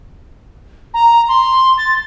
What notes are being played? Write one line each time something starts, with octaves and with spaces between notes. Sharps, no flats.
A#5
C6
A6